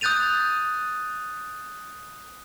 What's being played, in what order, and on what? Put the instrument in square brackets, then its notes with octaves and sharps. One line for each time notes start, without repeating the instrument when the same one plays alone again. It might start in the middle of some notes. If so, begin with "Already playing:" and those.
[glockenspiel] D#6 F#6 G6 A6 D#7 F7